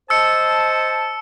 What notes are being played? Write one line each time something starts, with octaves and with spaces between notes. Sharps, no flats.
C5 D#5 A5 E6 C#7